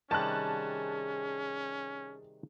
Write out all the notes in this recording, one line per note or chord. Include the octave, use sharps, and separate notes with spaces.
C3 D#3 G3 C#4 G#4 A5 F#6